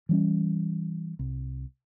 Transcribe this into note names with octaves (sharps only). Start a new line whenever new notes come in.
E3 G3 C#4
C2